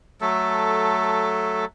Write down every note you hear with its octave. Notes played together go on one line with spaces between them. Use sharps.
F#3 A3 A4